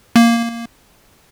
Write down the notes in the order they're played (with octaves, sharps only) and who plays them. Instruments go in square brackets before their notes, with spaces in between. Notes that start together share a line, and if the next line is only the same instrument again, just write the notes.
[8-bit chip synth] A#3